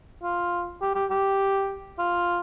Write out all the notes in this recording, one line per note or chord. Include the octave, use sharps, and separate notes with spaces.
F4
G4
G4
G4
F4